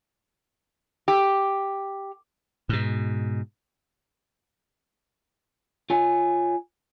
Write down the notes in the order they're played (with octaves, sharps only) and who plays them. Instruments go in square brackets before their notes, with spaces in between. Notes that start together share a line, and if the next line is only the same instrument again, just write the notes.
[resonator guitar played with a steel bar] G4
[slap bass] G#2 B2
[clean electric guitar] F4 C#5 G#5